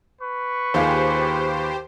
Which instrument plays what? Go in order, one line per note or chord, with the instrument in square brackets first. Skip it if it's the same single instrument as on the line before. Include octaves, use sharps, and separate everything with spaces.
[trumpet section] B4 C#6
[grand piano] D#2 F4 G#4 [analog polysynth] G4 C5